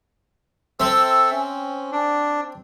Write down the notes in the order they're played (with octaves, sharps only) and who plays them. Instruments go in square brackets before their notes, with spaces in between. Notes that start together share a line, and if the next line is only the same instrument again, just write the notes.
[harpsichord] C4 [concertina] A4 E5
[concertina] C#4
D4